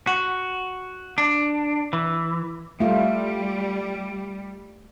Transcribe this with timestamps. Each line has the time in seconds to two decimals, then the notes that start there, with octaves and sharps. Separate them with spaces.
0.07 F#4
1.18 D4
1.93 E3
2.80 G3 A3 F4